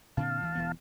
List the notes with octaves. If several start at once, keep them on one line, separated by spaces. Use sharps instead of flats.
A#2 D3 C4 F5 A5
D2 E3
E1 E3 B3